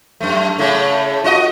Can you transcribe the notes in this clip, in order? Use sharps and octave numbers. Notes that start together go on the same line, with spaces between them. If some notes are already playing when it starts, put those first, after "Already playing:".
F#2 A3
A2 C#3 A3
F4 F#4 D#5